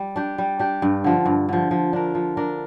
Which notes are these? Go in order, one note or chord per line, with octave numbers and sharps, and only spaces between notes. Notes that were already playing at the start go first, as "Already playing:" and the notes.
Already playing: G3
D4 G4
G3
D4 G4
G2
D3 F3
G2
D3 F3
F3
D4 A#4
F3
D4 A#4